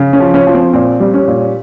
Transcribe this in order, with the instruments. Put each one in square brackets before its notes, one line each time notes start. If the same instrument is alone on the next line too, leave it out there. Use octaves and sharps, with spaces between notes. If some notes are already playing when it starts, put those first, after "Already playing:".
Already playing: [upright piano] C#3
C#4
F3
C#4
F3
C4
A#2 C4
G3
C#4
A#2